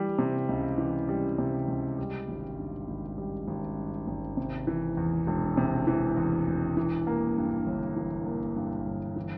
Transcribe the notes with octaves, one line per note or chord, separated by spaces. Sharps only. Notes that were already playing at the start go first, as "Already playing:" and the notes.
Already playing: E3 G3
C3
C#2
E3
G3
C3
C#2
G3
G#1
G2
G#1
G3
G#1
G2
G#1
C3
E3
E2
E1
C3
E3
E2
E1
E3
A#3
G2
G1
E3
A#3
G2
G1
E3